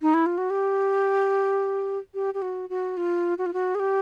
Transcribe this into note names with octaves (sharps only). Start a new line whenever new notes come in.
D#4
E4
F4
F#4
G4
G4
G4
F#4
F#4
F4
F#4
F4
F#4
G#4
G4